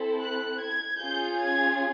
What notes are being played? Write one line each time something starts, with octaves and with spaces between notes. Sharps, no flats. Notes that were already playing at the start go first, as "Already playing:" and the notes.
Already playing: C4 E4 A4
F#6
G#6
C#4 F4 G#4 G6
G#6